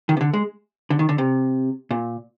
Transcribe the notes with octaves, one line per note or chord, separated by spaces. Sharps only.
D#3
C3
D3
G#3
D3
D#3
D3
C3
A#2